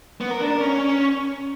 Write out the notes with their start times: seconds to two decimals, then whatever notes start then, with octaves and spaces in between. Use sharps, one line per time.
0.21 B3
0.31 A#4
0.41 D4
0.50 A#4
0.60 C#4